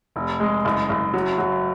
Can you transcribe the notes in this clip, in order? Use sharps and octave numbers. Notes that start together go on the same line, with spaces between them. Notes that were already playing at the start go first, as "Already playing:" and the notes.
F1
G#3
F#1
F#1
F#3
F#3